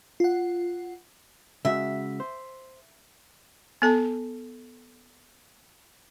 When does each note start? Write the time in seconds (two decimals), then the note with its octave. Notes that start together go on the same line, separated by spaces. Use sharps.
0.20 F4 F#5
1.65 C#3 G#3 F#4 E5
2.20 C5
3.82 B3 A4 A5